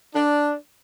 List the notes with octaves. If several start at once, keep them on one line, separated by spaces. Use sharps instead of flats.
D4